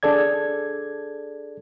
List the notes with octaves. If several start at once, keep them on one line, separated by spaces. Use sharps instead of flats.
D4 G#4 A4 D5 G#6